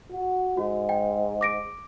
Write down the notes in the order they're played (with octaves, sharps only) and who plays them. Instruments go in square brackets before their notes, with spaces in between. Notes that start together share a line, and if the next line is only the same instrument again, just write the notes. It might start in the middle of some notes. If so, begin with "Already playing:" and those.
[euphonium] F#4
[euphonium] G#2 [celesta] F#4
[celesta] G5
D6 A#6 D7